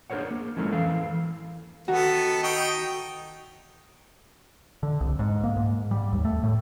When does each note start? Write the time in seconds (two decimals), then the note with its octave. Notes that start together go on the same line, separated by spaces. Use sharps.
0.10 D4 G#4 A#4 C5 C#5 F#5
0.31 A#3
0.57 F3 G#3 A3 C#4 E4 A#4
0.72 E3 A4 F5
1.88 D#3 B3 D#4 F#4 A4
2.43 D#4 G5 C#6
4.83 D3
5.01 C2
5.19 G#2
5.44 A#3
5.57 G#2
5.91 G3
6.13 D#2
6.25 A3
6.44 A2